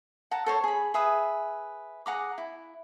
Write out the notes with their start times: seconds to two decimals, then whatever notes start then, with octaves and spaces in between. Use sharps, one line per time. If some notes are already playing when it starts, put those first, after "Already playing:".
0.31 F#5 A5 A#5
0.46 A4 C5 C#5
0.64 G#4 B5
0.94 G#4 B4 E5 D#6
2.06 G#4 F#5 A#5 D6
2.38 E4